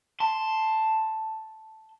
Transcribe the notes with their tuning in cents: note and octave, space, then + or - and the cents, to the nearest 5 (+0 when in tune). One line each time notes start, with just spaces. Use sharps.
A5 +0 C6 +0